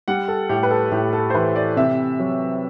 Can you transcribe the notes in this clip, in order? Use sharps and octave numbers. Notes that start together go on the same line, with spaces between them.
G3 F#5
A4
A2 G4
B4
A4
A2 G4
A4
C5
E3 B4
D5
C3 E5
F#3